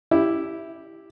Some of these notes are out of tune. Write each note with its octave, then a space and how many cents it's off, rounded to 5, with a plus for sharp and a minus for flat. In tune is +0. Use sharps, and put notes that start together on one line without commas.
E4 +0 G4 +0